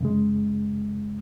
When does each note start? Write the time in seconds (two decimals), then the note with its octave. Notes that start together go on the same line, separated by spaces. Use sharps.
0.01 F#2 C#3 G#3